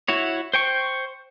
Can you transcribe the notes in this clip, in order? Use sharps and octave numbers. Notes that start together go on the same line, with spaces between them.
E4 F#4 C#5
C5 G5 C#6